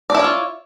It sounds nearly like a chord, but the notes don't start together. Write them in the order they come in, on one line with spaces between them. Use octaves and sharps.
D5 E4 C#5 F4